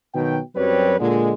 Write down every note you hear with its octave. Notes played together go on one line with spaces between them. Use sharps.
B2 D#3 F#3 G5
F#2 F#3 G3 C4 B4 C#5
A#2 D3 G#3